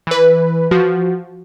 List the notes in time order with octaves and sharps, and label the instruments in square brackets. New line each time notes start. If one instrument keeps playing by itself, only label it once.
[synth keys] E3 B4
F3 F#4